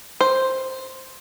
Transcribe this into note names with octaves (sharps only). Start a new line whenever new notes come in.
C5